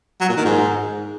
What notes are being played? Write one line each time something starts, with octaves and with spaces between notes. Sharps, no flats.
F#3
A#2
D#3
G#2